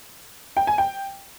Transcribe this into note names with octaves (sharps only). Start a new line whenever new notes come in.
G5
G#5
G5